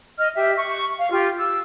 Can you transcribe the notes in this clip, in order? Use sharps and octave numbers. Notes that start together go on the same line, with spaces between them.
D#5 F6
G4 E5
C#6
F5
F4 G4
E6